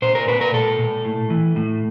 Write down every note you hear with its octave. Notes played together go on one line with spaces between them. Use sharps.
A#2 C5
A#4
A#2 B4
A#4
A#2 A4
A#2
A2
E3
A2